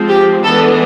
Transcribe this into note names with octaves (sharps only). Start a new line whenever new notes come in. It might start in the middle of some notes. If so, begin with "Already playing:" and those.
Already playing: F3 G#3 C4
G4
E3 G#3 B3 D4 A4